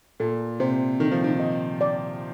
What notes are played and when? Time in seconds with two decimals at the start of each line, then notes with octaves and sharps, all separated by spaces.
0.20 A#2 A4
0.60 C3 C5
1.00 D#3 A4
1.11 F3
1.24 D#3
1.40 D#5
1.81 D5